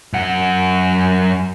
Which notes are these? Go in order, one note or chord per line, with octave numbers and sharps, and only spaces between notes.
F#2 F#5